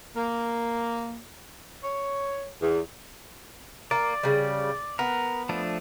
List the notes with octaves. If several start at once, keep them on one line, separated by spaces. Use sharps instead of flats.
A#3
C#5
E2
A#3 D5
C#3 G3
B3 A#4
F3 A3 D4